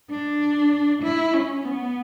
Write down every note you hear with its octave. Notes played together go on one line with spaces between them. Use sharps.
D4
E4
C#4
B3